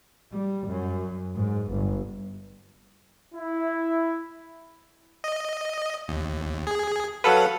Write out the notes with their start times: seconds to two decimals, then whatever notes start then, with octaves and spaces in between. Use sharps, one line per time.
0.32 G3
0.67 F#2
1.36 G#2
1.71 G1
3.35 E4
5.24 D#5
6.08 D#2
6.67 G#4
7.24 F#3 A4 B4 F5 F#5